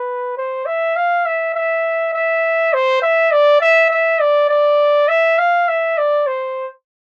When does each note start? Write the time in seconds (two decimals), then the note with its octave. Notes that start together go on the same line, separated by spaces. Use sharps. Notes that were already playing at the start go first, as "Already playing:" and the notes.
Already playing: B4
0.37 C5
0.66 E5
0.96 F5
1.25 E5
1.55 E5
2.14 E5
2.73 C5
3.02 E5
3.32 D5
3.61 E5
3.90 E5
4.21 D5
4.49 D5
5.08 E5
5.38 F5
5.68 E5
5.98 D5
6.27 C5